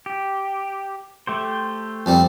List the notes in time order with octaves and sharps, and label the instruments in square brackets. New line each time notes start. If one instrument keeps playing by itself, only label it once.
[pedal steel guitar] G4
A3 G4 C5
[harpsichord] F2 G3 C4